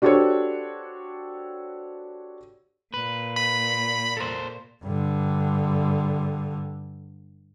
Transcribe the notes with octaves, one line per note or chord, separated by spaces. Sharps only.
D4 F#4 G4 A4 C5 C#5
A#2 B4
B5
A4 A#4 C5
G2 D3